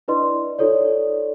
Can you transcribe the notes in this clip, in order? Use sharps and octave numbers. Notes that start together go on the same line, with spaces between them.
D4 E4 B4 D5 D#5 C6
D#4 F4 A4 C#5 D5